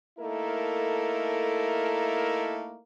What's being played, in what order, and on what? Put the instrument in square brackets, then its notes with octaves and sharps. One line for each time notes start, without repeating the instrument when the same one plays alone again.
[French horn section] A3 A#3 D#4 E4 A4 A#4